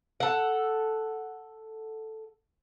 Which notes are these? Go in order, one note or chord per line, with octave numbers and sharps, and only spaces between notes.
A4 F#5